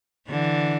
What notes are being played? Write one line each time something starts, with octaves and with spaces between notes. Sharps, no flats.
D3 E3